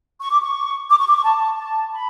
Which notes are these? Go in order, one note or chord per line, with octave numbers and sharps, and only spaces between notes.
C#6
D6
C#6
D6
C#6
D6
C#6
A5
A5
B5